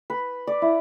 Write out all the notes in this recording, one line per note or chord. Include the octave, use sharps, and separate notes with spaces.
B4
D5
E4